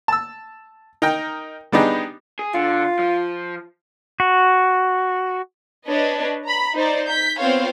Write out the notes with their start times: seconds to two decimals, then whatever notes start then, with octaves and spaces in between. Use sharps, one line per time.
0.08 A5 E6
1.02 D#4 A#4 G5
1.72 G3 B3 D4 D#4 G4 G#4
2.39 G#4
2.54 D3 F4
2.99 F3
4.20 F#4
5.87 D4 B4 C#5 D#5
6.44 A#5 B5
6.74 D#4 C5 D5
7.08 G6 B6
7.39 B3 C4 F4 C5 C#5 F5